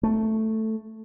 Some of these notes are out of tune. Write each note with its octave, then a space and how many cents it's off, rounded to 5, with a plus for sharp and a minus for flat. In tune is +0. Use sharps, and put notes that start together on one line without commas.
A3 +0